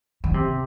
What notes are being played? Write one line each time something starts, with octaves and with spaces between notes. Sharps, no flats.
D#3
C3